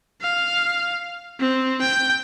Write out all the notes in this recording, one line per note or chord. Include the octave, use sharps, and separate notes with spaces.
F5
C4
G5